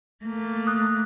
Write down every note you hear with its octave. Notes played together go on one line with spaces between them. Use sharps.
A3 A#3
D#6 F#6